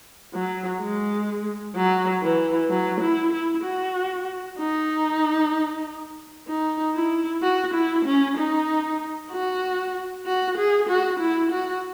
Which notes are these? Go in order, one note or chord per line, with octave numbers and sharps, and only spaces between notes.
F#3
G#3
F#3
E3
F#3
E4
E4
F#4
D#4
D#4
E4
F#4
E4
C#4
D#4
F#4
F#4
G#4
F#4
E4
F#4